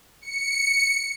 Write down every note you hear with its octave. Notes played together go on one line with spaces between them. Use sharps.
C#7